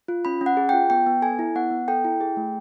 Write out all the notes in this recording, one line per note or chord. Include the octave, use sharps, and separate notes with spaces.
F4
C#4 B5
C#4
F#5
G#4
F4 G5
B3 G5
B3
A4 G#5
E4
B3 F#5
B3
A4 G5
E4
G#4
A3